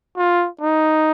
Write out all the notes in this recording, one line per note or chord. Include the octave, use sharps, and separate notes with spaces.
F4
D#4